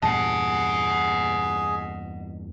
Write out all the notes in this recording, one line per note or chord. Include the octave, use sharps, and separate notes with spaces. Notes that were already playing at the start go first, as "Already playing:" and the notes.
E2 G2 A#2 G#4 D#5 F#5 A5